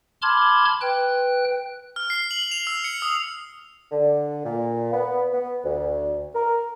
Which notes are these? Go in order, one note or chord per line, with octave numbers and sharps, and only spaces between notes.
A5 B5 C6 D6 F6 G#6
B4 G5 F#6
F6
C7
F#7
F7
E6
C#7
D#6
D3
A#2
B3
B3
D2
A#4